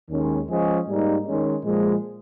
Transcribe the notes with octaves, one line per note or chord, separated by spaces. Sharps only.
D#2 D#3 G#3 C#4
F3 G#3 C#4 G#4 D#5
G#2 G3 A#3 D#4
D#3 G#3 C#4
A#2 F3 G#3